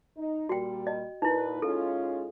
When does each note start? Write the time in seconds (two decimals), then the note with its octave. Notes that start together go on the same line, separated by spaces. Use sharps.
0.16 D#4
0.49 A#2 G3 F#4 G5
0.87 D#5
1.22 A#2 D#4 E4 B4
1.62 G#3 C#4 F4 A4